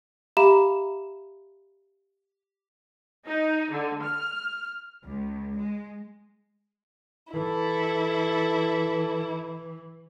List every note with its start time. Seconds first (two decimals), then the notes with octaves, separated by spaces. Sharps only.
0.37 G4 E5 F5 A#5 B5 E7
3.26 D#4
3.71 D3
4.04 F6
5.05 C#2
5.57 G#3
7.33 E3 E4 A4